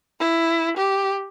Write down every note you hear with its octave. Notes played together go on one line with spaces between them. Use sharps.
E4
G4